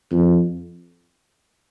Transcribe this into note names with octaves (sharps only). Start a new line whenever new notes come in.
F2